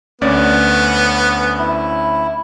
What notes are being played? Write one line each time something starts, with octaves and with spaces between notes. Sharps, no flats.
D2 B3 C#4 D5
E4